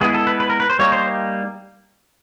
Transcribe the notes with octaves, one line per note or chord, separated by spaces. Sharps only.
G#3 B3 E4 G#4
A4
B4
B4
A#4
B4
C5
G3 A#3 D#4 C#5
C5